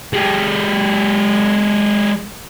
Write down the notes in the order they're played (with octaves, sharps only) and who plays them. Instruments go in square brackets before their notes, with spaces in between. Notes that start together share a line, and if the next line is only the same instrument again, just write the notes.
[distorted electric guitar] G#3 G4